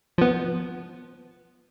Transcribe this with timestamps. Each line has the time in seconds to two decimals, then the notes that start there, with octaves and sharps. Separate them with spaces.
0.18 F3 B3